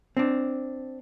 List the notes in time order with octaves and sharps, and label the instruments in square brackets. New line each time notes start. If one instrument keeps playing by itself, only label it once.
[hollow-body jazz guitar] C4 D4